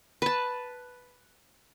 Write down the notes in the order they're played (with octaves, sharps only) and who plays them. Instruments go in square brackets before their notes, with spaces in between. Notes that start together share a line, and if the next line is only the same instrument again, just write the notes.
[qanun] B4 A5